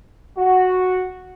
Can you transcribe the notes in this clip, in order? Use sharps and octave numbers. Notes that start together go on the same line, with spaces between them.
F#4